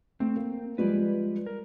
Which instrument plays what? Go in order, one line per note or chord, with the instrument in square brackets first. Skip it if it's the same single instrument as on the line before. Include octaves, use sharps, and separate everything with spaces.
[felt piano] A3 [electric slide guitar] C4
[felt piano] A#3
[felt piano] F3 G3 G#3 [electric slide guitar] B4 D5
[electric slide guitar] A#4